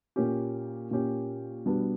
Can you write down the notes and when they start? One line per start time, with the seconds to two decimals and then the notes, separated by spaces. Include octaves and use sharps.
0.16 A#2 A#3 C#4 G4
0.91 A#2 A#3 C#4 G4
1.66 B2 G3 B3 D4